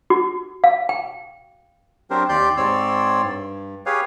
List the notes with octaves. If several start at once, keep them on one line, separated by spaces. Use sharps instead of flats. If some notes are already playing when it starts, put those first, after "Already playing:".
F#4
F5
G5
F#3 C4 D4 G4 A#4 C5
D#2 G4 D5 C6 G6
G#2 C4 C#5 D5 C6 E6
G2
G4 G#4 B4 C#5 F5